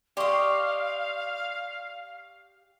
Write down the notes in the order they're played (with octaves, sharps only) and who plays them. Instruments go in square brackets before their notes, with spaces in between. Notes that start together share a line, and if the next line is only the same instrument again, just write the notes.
[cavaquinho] G4 D#5 [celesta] D5 C6 C#6 [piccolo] F5